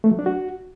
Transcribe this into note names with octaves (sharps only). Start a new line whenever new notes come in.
A3
F#3
D4
F#4